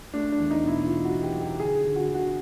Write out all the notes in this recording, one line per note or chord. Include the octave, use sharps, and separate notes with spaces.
A3 D4
D4
E2
D#4
B2
E4
E2 F4
F#4
E2
G4
F#3
G4
D3 G#4
D3
F#4
D3
F#4